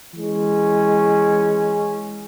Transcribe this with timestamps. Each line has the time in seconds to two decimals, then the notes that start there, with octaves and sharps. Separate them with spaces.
0.14 E3 G#3 C#4